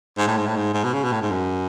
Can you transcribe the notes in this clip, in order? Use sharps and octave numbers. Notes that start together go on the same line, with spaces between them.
G#2
A2
G#2
A2
G#2
G#2
B2
C#3
B2
A2
G#2
F#2